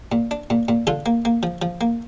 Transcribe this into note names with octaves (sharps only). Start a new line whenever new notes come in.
A#2
D4
A#2
A#2
D3 F4 A4
A#3
A#3
F3
F3
A#3